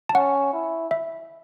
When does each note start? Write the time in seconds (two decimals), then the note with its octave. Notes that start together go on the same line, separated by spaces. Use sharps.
0.09 A5
0.14 C#4 F#5
0.53 E4
0.91 E5